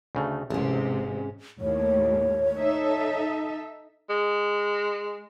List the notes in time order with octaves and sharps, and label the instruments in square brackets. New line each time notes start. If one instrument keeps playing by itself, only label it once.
[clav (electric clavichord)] D2 C#3 A3
[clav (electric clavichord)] A1 [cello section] G#2 C3 [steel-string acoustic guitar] G#3 C#4
[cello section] D#2 A2 [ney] C#5
[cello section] D#4 A4 E5
[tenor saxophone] G#3